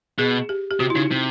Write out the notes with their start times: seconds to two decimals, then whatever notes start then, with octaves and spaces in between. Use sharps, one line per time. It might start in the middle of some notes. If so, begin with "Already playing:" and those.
0.18 B2 G#4
0.49 G4
0.71 G4
0.80 C3 F#4
0.90 E4
0.96 C#3 D#4
1.11 C3